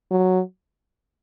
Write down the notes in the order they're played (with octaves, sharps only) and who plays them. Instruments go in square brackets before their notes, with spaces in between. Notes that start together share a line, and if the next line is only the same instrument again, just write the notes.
[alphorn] F#3